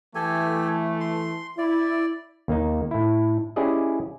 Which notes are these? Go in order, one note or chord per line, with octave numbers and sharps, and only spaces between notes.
E3 A3 G4 A4 G#5
C6
E4 D5
D#2 A#3 D#4
A2 E4
C#4 E4 G4 G#4 D5 D#5